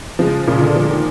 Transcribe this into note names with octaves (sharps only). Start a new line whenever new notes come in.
C#3 F3 G#3
A#2 C#3
D3
D3 F3 G#3
D#3